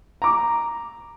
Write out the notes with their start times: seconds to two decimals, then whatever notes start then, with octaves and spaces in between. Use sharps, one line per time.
0.22 A#5 D6